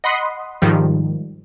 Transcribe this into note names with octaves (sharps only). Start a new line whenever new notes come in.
D#5 F#5 B5 C6 D#6
G#2 D#3 F3 G3